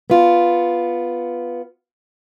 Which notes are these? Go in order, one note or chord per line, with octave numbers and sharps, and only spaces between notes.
B3 F4